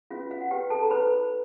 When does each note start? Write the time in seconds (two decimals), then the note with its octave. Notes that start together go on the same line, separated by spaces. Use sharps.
0.11 C#4 F4 F#4 B4 F5
0.31 F5
0.41 F#5
0.51 C#4 F#4 G4 B4 G5
0.70 A4 A5
0.82 A#5
0.90 E4 A4 B4 C5 B5